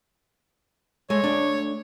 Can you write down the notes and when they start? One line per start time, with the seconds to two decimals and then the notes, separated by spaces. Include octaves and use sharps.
1.10 G#3 A3 C#5
1.24 A3 D4